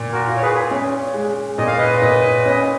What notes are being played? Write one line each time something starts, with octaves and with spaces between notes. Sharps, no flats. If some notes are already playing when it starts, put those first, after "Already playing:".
Already playing: A#2
F#4 A#4
F4
C#5
G#4 B4
C#4
G#3
A#2 D#5
F5
B4 D#5
A#2
C#4